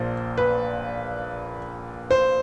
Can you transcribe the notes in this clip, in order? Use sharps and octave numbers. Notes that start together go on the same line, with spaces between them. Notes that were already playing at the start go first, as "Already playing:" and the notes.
Already playing: A#1 A#2 C5
B4
C5